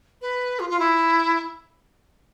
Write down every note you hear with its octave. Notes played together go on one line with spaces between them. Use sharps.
B4
F4
F4
E4